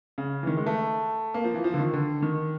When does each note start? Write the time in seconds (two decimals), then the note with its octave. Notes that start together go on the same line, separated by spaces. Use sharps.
0.18 C#3
0.43 E3
0.47 D#3
0.57 G#3
0.66 A3
1.34 A#3
1.44 F3
1.54 E3
1.64 F3
1.74 D3
1.79 D#3
1.93 D3
2.22 D#3